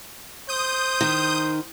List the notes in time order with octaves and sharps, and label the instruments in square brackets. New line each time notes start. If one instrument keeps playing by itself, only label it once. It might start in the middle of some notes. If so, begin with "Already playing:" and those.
[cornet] C5 [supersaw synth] D#6 G6
[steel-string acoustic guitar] D#3